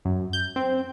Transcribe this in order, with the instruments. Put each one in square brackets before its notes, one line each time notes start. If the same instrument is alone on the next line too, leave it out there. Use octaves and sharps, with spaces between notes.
[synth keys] F#2
G6
C4